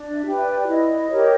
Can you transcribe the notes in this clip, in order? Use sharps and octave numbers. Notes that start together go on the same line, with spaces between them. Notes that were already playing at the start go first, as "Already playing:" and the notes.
Already playing: D4
E5
G4 B4
D5
E4 D#5
G4 A#4 C#5